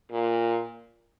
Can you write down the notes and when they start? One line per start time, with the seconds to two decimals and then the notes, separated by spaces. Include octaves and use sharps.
0.11 A#2